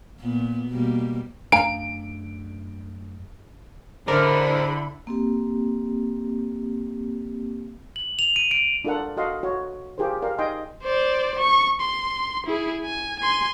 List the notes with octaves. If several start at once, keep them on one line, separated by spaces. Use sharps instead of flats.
A#2 B3
B2 G3 A#3
F#2 A3 D4 F5 G#5 A#5 D7
D3 E4 G#4 A#4 C5 D5 B5
A#3 C4 G4
F#7
F7
D#7
D7
D4 F4 A4 A#4 F#5
F#4 A4 D#5 F5 F#5 C6
F#4 C#5
F4 G4 G#4 A#4 C5
G4 A#4 D5 F5
D#4 D#5 G5 G#5 C6
C5 D5
C#6
C6
E4 G#4
G#5
G#5 C6